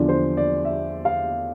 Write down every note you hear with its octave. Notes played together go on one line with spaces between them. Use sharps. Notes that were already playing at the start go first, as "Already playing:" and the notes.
Already playing: E2 D3 F3 D5
C5
D5
E5
F5